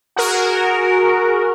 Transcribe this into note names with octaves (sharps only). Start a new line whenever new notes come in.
F#4 G#4 A#4